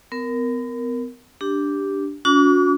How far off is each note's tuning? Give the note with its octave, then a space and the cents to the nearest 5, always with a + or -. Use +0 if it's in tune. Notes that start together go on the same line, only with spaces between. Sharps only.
B3 +40 A#4 +0
D4 -5 G4 +0
C#4 +45 F#4 -35 D6 -40